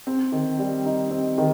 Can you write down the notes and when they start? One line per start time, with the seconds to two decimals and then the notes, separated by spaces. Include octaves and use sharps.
0.07 C4
0.32 D#3
0.59 G3
0.85 D#4
1.10 C4
1.38 D#3